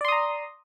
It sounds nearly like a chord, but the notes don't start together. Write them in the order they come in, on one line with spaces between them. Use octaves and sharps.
D5 C6 D#6 A#5